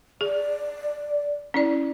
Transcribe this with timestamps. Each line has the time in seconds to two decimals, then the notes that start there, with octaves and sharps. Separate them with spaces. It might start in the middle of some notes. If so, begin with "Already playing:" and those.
0.21 G#4 D5
1.54 C#4 E4 D5